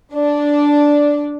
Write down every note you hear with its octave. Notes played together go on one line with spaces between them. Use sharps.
D4